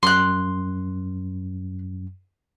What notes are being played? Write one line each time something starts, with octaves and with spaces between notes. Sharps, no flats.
F#2 C6 F#6